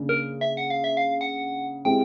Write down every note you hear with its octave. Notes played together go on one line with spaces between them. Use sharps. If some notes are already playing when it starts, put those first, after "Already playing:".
Already playing: C#3 A#3 D4
A#4
E5
F#5
F5
E5
F5
F#5
G#3 C4 E4 G4 G5